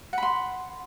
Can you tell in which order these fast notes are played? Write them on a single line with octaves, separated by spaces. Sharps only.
F#5 B5 C6